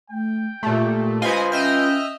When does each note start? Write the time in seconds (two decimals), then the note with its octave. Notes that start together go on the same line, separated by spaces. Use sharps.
0.10 A3 G5
0.63 A#2 A3 G4
1.22 F4 B4 C5 D#5 G#5
1.52 C#4 D#5 E5 G5 F6